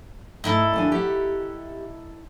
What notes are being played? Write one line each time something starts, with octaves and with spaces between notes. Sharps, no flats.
G#2 A3 D#4 E4 A4
D#2 D4 G#5
G4 E5 F#5